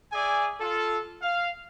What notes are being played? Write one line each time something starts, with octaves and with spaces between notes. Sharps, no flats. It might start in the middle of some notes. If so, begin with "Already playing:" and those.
G#4 D5 E5 G#5
F4 A4
F5